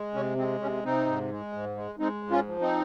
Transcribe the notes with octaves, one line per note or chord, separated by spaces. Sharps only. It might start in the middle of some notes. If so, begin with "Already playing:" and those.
Already playing: G#3
C3 C#4
G#3 C4
C3 C#4
C3 C4 D#4
G#2
G#3
G#2
G#3
G#3 C4 D#4
G#2
C#4 F4
F3
C4 D#4